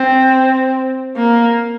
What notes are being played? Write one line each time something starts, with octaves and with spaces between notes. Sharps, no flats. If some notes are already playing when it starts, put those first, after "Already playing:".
Already playing: C4
A#3